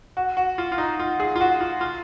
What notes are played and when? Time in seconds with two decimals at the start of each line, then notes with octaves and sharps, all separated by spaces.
0.17 F#4
0.37 F#4
0.58 F4
0.72 F4
0.78 D#4
0.99 F4
1.20 G#4
1.36 F4
1.41 F#4
1.61 F4
1.81 F4